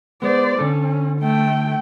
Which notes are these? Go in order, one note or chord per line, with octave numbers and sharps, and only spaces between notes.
G#3 B3 C5 D5
D3 C#4 A4
A3 G5